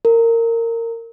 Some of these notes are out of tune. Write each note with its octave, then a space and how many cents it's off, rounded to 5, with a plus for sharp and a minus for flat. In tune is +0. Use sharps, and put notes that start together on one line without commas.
A#4 -20